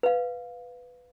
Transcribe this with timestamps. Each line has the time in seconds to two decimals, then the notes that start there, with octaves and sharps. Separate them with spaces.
0.03 B4 F5